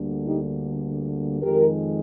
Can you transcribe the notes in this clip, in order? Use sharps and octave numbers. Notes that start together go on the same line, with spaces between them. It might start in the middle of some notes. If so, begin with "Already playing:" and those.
Already playing: D2 D3 G3 A#3
D#4 G4
F2 D#3 G#3 G4 A#4